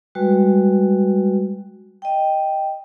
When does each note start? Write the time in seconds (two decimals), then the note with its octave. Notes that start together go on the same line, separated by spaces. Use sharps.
0.15 G3 G#3 F#4 B4
2.02 D#5 G5